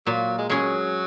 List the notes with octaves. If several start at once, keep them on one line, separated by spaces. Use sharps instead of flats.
A#2 F#3
G#3
F#3 G#3 C#4 G#4 C#5